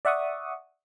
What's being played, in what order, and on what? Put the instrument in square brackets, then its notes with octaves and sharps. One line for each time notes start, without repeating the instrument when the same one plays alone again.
[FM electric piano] D5 E5 F#5 C#6 D#6